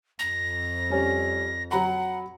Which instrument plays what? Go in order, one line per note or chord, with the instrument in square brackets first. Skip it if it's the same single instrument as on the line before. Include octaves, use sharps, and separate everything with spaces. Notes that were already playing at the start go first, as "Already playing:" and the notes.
[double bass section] F2 [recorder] A#6
[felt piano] G3 C#4
[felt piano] F#3 A#5 B5 [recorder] F#5